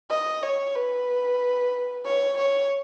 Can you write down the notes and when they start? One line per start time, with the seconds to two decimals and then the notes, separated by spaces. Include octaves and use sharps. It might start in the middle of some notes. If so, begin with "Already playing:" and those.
0.10 D#5
0.43 C#5
0.75 B4
2.05 C#5
2.38 C#5